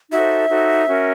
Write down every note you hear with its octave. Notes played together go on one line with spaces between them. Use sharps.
D#4 F#4 A4 C5 E5
D#4 F#4 A4 C5
C#4 F#4 A#4